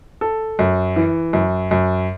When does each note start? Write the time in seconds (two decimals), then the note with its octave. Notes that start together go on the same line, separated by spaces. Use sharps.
0.21 A4
0.59 F#2
0.96 E3
1.33 F#2
1.71 F#2